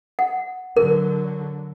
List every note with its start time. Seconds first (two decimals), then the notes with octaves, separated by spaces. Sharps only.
0.19 F#5
0.77 D3 F#3 A#4